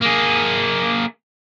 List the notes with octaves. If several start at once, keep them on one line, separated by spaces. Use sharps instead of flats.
A#3 G#4